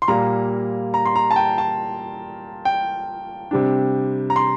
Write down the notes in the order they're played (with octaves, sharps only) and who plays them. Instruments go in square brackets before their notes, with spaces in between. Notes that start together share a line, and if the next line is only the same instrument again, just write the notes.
[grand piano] C6
A#2 G3 A#3 A#5
A#5
C6
A#5
A5
G5
A5
G5
C3 G3 D4
A#5
C6